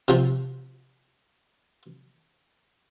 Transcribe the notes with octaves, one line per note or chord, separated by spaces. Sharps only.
C3 F3